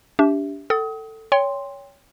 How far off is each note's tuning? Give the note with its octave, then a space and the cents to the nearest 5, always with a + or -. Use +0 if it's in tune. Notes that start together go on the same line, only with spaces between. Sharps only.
D4 -30 G4 +0 E5 +0
A4 +15 G5 -45 D#6 +30
C#5 +20 G5 +25 C6 +0